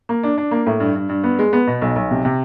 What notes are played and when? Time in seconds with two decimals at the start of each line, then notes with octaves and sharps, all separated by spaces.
0.09 A#3
0.23 D4
0.38 D4
0.51 A#3
0.66 A2
0.80 G2
0.96 G2
1.09 G2
1.24 B3
1.39 G#3
1.53 B3
1.67 B2
1.82 B1
1.96 B1
2.11 C3
2.25 C3